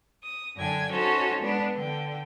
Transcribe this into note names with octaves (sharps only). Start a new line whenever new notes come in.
D#6
F#2 D3 D4 G5 G#5 G#6
C#4 D#4 F#4 A4 C5 C#5
G#3 B3 D4
D3 G5